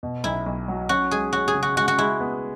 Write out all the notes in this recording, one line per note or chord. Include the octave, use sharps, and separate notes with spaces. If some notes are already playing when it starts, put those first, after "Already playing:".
B2
B1 E4
B1
F#3
C#4 F#4
G#3 G#4
C#4 F#4
G#4
C#3
F#4
G#3 F#4
F#4
G#3 E4
B3